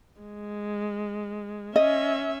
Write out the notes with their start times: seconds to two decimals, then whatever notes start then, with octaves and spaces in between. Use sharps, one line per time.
0.21 G#3
1.76 C#4 D#5 E5